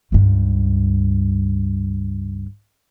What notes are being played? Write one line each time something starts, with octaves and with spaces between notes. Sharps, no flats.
C#2 G2